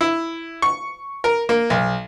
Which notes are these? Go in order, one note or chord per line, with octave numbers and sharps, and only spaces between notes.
E4
C#6
A#4
A#3
B1